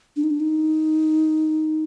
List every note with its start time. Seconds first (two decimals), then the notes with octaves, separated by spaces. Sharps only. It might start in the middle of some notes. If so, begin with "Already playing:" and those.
0.16 D4
0.24 D#4
0.31 D4
0.40 D#4